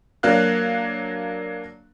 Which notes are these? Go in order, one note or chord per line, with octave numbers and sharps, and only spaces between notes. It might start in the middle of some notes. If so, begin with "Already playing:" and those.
F#3 A#3 D4 F5 F#6